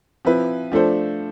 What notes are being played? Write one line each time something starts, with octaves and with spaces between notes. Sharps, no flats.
F3 C4 E4 B4
F3 A3 D4 A4 C5